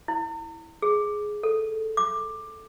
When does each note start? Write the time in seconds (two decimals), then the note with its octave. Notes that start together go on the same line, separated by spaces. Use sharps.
0.08 E4
0.82 G#4
1.43 A4
1.97 D6